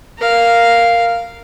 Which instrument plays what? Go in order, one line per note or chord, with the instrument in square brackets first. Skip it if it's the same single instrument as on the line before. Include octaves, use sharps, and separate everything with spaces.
[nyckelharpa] A#4 F5